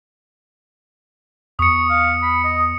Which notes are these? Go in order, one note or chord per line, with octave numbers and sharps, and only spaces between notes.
E2 C#6 D#6 C#7
F5
B5
D#5